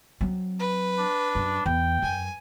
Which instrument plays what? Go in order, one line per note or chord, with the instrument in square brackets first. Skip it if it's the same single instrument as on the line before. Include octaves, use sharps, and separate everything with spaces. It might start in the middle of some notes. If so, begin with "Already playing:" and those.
[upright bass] F#3 C4
[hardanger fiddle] B4
[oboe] D4
[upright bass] F#2
[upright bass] E2 [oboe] G5
[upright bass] F#2 [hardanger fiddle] G#5